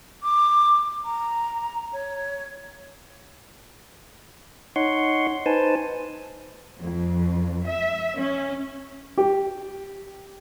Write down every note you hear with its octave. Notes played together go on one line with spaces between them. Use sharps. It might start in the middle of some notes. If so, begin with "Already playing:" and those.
D6
A#5
C#5
D#4 C#5 F#5 C6
D#4 B4 C5 G#5 A5
F2
E5
C#4
G4